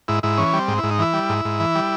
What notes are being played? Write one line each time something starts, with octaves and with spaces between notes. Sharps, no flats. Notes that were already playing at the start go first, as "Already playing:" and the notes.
G#2 E4
G#2 E4
E3 C#4
G3
C4
G#2
E4
G#2
D#4
E3 E4
G3
G#2
G#2
E3
G3